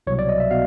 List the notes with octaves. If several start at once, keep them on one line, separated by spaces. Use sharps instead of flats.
C2 B2 F#3 C#5
D5
D#5
E5
B2 F5